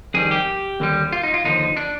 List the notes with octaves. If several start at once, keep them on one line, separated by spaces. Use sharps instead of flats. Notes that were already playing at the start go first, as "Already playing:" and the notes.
F2 D#3 G3 G#4
G4
D#2 D3 G3
F4
D#4
F4
D#2 D3 F3 D#4
D4